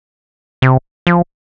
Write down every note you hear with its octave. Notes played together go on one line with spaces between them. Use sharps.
C3
F3